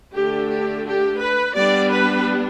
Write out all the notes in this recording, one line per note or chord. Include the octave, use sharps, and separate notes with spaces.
D3 A3 D4 G4
G4
G4
B4
G3 B3 D4 D5
B4